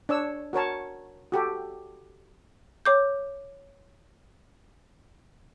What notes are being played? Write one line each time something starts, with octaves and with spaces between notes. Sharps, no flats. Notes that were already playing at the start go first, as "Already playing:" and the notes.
D4 C#5 E6
F#4 A#4 C#5 A5
F#4 G4 A4
C#5 D6 G6